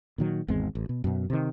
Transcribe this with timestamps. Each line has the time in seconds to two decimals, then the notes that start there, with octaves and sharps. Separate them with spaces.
0.18 A#2 D#3 F#3
0.48 G#1 E2 G#3 C4
0.75 A1
0.89 B2
1.04 F#2 B2
1.30 C3 D#3